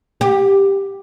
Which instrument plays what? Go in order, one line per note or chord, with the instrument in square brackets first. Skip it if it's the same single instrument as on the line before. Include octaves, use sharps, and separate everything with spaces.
[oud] G4